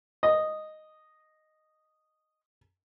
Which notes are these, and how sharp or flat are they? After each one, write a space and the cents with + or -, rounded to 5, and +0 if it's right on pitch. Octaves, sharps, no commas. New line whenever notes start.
D#5 -5